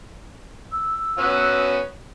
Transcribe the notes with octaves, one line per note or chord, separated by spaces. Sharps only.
E6
B3 C#4 F#4